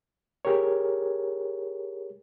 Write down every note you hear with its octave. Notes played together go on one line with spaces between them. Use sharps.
G4 G#4 A#4 C#5